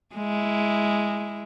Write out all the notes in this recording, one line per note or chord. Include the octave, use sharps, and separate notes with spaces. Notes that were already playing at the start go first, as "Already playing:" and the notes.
G#3 E4